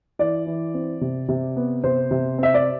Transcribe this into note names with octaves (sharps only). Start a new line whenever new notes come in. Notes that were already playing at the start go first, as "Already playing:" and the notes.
E3 D5
E3
C4
C3
C3
B3
C3 C5
C3
C4 E5
D5